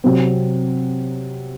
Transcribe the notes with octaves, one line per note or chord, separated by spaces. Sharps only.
C3 F#3 C4